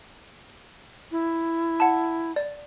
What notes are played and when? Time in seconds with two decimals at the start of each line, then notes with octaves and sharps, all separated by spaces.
1.12 E4
1.80 F#5 A5
2.36 D5